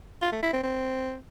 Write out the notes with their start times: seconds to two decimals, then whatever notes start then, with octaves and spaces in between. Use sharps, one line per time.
0.22 F4
0.32 A3
0.43 E4
0.53 C4
0.63 C4